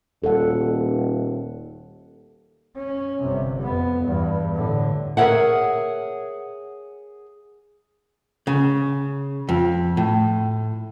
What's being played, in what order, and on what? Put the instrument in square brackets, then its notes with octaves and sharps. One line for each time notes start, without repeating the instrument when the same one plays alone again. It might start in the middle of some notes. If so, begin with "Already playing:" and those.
[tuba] D#1 [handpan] A4 F#5
[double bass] C#4
G1 C3
F2 B3
E2 G2
A2 D3
[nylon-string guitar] G#4 A#4 C#5 E5 F#5
[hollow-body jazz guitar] C#3
F2
A2